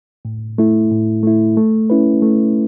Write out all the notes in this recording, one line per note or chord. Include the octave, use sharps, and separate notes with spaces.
A2
A3 E4
A2
A3 E4
A3
C#4 E4 B4
A3